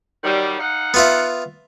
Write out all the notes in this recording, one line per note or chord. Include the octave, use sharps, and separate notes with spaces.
D#3 F#3 G3
D#4 F5 F#5
B3 F4 E5